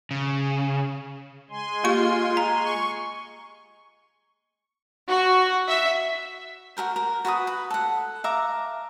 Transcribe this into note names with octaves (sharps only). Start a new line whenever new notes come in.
C#3
G#3 G#5 C6
A#3 F4 G4 C#6
A#5
C#6
F#4
E5
F#4 G#4 A#4 C5
A#4
F#4 B4 A5 D#6
B4
A4 F#5
E5 F5 A#5 D6